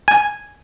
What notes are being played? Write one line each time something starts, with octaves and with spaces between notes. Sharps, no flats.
G#5